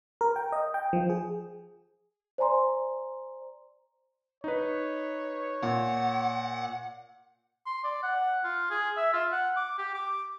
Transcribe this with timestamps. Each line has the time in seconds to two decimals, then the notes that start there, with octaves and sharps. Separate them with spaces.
0.21 A#4
0.36 G5
0.52 D#5
0.74 G5
0.93 F3
1.10 G#4
2.38 C5 D5 G#5 A#5 C6
4.44 D#4 B4 C#5
5.63 A#2 F#5
7.66 C6
7.84 D5
8.03 F#5
8.44 F4
8.70 G#4
8.97 E5
9.13 F4
9.32 F#5
9.57 D6
9.78 G4
9.94 D6